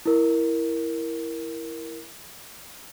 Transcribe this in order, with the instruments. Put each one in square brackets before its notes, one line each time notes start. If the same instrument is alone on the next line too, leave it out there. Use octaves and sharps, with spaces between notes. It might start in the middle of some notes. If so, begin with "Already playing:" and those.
[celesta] E4 A#4